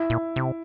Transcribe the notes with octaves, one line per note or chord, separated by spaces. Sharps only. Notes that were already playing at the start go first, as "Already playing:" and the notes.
Already playing: E4
A#2
C3